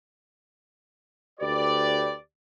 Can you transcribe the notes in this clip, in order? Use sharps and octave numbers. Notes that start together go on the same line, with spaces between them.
D2 G4 B4 D5